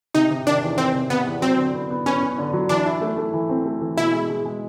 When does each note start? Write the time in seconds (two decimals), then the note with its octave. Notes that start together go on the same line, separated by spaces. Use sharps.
0.14 C3 D#4
0.30 C3
0.47 D#3 D4
0.63 E2
0.78 E2 C4
0.95 C3
1.10 C3 B3
1.26 E2
1.42 F#3 C4
1.58 D3
1.74 B3
1.90 B3
2.06 B3 C#4
2.22 B3
2.38 D3
2.53 F#3
2.69 E3 D4
2.86 E4
3.01 A3
3.17 A3
3.34 E3
3.50 C4
3.65 A3
3.81 E3
3.97 B2 E4
4.13 G#3
4.30 G#3
4.45 G#3